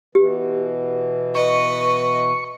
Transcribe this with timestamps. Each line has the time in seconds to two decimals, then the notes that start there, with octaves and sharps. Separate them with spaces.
0.15 B2 E3 G4
1.35 B4 D#5 C#6